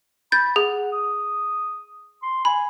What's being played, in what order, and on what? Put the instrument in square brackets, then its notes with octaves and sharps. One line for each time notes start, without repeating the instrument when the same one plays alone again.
[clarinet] B5 [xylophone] G6 A6
[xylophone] G#4 [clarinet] F#5
[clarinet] D#6
C6
[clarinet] G#5 [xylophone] B5